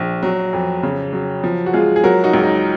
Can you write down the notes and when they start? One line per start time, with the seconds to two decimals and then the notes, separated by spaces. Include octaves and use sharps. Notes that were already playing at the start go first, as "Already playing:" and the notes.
Already playing: A#1
0.23 F#3
0.53 F2
0.83 C#3
1.13 F#3
1.44 F3
1.66 F#4
1.73 G#3 F4 G#4
1.96 G#4
2.04 F#3 F#4 A#4
2.24 D#4 F#4
2.33 C#2
2.43 D#4